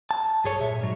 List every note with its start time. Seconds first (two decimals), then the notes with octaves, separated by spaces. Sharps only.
0.11 A5
0.44 B1 G2 G#4 A4 C#5
0.61 A#2 E5
0.81 G#2 F#3